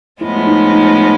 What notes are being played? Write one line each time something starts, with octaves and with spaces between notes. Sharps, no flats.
A2 F3 G#3 B3 E4
E4
D#4
D#4
D#4